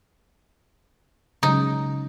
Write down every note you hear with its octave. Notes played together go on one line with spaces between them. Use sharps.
C#3 F#3 G#3 D#4